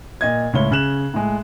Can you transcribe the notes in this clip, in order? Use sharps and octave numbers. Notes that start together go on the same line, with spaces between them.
A#2 D#5 G#6
C#2 A2 C#5 G7
C#3 F#6 E7 F#7
A2 G#3